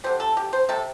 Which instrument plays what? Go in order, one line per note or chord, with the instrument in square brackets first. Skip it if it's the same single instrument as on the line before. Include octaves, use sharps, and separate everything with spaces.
[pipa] D3 G3 C5
A4
G4
C5
C3 G3 A4